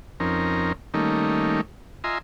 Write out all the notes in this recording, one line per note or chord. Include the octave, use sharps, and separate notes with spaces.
F2 C4 C#4 D#4 A#4
D#3 G3 A3 A#3 C#4 D#4
F4 D#5 E5 G#5 A#5 C6